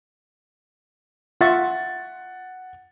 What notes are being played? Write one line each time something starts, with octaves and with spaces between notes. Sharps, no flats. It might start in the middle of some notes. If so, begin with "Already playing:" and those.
F4 E5 F#5 C#6 A6